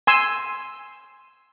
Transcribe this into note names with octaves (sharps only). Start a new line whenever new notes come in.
G#5 C6 E6